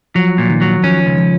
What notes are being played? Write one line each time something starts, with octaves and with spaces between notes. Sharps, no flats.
F3 F#3
A#2
D#3
F#3
F3 C#4
C#2
F3